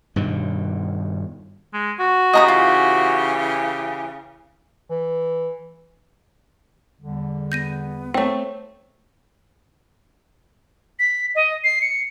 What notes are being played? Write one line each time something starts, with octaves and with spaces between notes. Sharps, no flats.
G2 B2 D#3
G#3
F#4
C#3 E3 G4 D#5 A#5 D#6
F4
E3
E2 D3 G3
B3 G6 A#6 D#7
A3 C4 C#5 G5
B6
D#5
C7
C#7